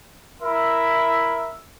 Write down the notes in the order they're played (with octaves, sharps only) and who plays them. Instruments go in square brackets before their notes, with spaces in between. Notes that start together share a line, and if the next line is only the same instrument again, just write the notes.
[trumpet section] E4 A#4 E5 B5